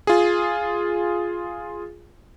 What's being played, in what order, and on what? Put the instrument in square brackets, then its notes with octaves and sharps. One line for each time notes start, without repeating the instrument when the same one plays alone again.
[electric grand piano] F4 G#4